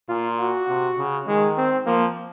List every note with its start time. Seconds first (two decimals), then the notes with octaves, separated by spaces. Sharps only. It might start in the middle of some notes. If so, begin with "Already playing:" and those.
0.09 A#2 F4
0.39 F#4
0.68 C3
0.98 C#3
1.28 D#3 G#3
1.57 C4
1.86 F3 A#3